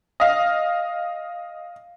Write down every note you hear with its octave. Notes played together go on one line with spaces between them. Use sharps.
D#5 F5